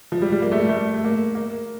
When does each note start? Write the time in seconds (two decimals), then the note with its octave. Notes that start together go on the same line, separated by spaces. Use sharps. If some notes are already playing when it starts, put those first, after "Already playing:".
0.12 F3
0.22 G3
0.32 G3
0.42 A#3
0.52 A3
0.60 G3
0.69 A3
0.94 A3
1.04 A#3
1.35 A#3